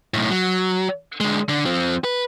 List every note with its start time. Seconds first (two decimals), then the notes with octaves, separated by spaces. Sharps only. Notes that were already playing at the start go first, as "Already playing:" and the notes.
0.14 B1 A2
0.30 F#3
1.20 D3 G#3
1.49 D3
1.65 F3 C4
2.04 B4